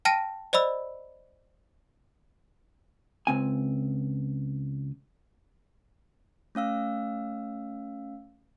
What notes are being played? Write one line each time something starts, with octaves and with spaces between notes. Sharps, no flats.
G5 A5 F6 A#6 D7 D#7
C5 D5 D#5 B5 E6
C#2 C4 G#5
A3 C#4 F5 E6